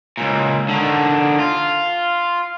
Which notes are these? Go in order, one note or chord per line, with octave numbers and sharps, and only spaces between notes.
C#2 A#2
D3 D#3
F4